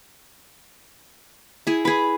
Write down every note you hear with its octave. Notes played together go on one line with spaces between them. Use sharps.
E4 G#4
G#4 B4 B5